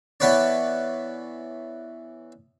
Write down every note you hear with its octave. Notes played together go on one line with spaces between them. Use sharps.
E3 B3 B4 C#5 D5